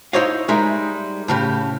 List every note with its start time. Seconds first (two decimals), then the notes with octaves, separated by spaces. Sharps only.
0.13 D#4 E4 C5 C#5 D#5 F5
0.48 G3 G#3 D#4 A#4 E5
1.28 A2 C#3 G4